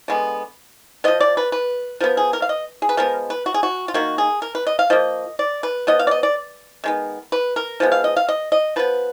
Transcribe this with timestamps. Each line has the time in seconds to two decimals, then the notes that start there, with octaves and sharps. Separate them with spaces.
0.08 D3 G#3 B3
1.04 F3 B3 D#5
1.21 D5
1.37 B4
1.52 B4
2.00 F3 B3 A#4
2.17 G#4
2.33 A#4
2.42 F5
2.49 D#5
2.82 G#4
2.89 B4
2.97 F3 G#3 B3 A#4
3.30 B4
3.46 F#4
3.54 G#4
3.63 F#4
3.88 F4
3.94 D#3 A#3 F#4
4.18 G#4
4.42 A#4
4.55 B4
4.67 D#5
4.79 F5
4.90 F3 A#3 D#5
5.39 D5
5.63 B4
5.87 F3 B3 D#5
5.99 F5
6.07 D5
6.11 D#5
6.23 D5
6.84 D#3 G#3 B3
7.32 B4
7.56 A#4
7.80 F3 G#3 B3
7.92 F5
8.04 D#5
8.17 F5
8.29 D#5
8.52 D#5
8.76 F3 B3 B4